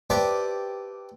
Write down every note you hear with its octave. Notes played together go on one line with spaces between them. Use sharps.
G4 B4 C5 D5 E5 A5